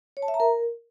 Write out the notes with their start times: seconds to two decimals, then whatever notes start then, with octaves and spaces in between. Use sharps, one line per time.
0.17 C#5
0.22 A5
0.28 E5
0.34 A#5
0.40 A#4